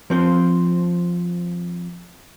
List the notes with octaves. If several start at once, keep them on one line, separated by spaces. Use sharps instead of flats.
F3 C4 C5